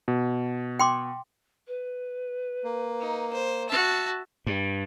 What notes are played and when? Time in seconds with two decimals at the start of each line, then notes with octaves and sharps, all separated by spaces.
0.08 B2
0.79 G5 C6 D6
1.67 B4
2.64 A#3
3.00 D#4
3.32 C5
3.69 F#4 E5 A5
4.47 G2